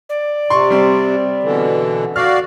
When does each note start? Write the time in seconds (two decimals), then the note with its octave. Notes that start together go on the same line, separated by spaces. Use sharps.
0.09 D5
0.50 C3 C6 C#6
0.70 G3 C4
1.43 B2 D3 E3
2.16 F#4 D5 F5 F6